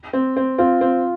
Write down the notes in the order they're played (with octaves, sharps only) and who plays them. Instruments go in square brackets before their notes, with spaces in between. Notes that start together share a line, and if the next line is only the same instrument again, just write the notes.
[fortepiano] C4
C4
[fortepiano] C4 [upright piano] F4
[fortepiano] C4